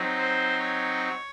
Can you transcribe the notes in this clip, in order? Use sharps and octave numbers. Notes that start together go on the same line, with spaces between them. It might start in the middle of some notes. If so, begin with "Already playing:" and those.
Already playing: F#3 C4 D#4
C5
C#5